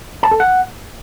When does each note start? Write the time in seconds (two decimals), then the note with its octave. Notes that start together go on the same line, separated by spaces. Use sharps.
0.23 A5
0.31 A4
0.40 F#5